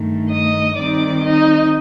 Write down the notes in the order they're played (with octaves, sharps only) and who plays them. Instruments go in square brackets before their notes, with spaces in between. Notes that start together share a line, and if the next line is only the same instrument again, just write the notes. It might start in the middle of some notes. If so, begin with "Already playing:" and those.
Already playing: [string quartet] G2 D#3 A3
D#5 D#6
D#3 G3 C4 D#4 D5 D6
D#4 D#5